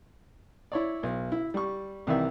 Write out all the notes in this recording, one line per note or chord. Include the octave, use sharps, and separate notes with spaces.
E4 C#5 D5
B1
E4
G3 C#6
C2 D#3 E3 D5 E5